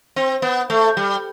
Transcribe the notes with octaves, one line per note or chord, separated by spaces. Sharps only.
C4
B3
A3
G3